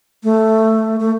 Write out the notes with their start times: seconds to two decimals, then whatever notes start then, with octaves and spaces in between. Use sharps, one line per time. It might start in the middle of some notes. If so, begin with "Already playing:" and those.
0.24 A3
1.00 A3